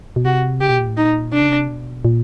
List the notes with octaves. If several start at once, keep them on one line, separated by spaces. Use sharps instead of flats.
B2
C3 F#4
C#3 G4
B2
A#2
A2
A#2 D#4
C3 D4
C#3
C3
B2
A#2